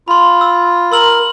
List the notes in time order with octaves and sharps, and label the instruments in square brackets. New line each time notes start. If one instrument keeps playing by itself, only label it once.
[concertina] F4 [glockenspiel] B5 C6
[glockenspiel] E6
[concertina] A#4 [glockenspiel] C6 E6 F#7